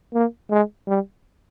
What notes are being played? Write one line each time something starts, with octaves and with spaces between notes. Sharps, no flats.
A#3
G#3
G3